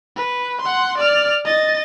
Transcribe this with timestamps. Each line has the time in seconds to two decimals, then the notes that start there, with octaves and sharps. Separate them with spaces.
0.16 B4
0.61 F#5 C6
0.98 D5 F6
1.45 D#5 A6